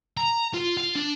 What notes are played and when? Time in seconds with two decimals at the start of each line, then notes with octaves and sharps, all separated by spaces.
0.17 A#5
0.54 F4
0.77 F4
0.96 D4